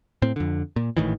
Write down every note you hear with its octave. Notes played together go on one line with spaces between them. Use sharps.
A2 C4
F2 D3
A#2
G#1 A2 D#3 E3